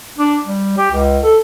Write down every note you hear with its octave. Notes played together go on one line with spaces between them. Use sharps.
D4
G3
G4
C#2
A4